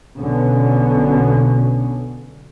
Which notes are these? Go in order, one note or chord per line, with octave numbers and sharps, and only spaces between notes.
B1 B2 D3 B3 C#4